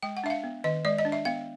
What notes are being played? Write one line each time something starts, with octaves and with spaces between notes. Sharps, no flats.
G#3 G5
F#5
D4 E5
F5
B3
D#3 D#5
G#3 D5
D#5
D4
E5
B3 F5